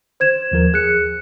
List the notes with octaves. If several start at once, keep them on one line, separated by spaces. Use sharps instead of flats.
C5 G#6 E7
D#2 F3 A#4
G#4 F#6 C#7